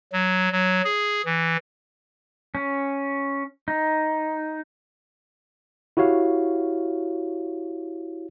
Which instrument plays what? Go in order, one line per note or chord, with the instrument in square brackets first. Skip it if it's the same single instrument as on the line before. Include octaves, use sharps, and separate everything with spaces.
[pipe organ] F#3
F#3
G#4
E3
[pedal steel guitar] C#4
D#4
[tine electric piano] E4 F#4 G4 C#5 F5